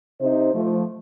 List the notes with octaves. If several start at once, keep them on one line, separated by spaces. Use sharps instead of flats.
C3 D#4 C5
F3 A3